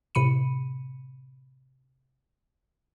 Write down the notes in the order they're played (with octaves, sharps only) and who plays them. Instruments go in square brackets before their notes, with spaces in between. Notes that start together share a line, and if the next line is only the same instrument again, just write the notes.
[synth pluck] A2 C3 B5 C#7 D#7